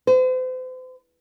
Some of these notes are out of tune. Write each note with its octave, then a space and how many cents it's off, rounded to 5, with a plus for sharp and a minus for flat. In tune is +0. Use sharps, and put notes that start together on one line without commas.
C5 -40